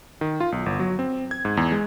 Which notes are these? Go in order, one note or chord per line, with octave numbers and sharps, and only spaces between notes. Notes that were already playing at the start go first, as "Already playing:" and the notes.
D#3
F4
B1
G1
F#3
C4
G#6
G#2
E2
G#3